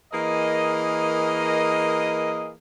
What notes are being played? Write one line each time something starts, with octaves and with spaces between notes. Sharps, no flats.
E3 A#3 G#4 A#4 D#5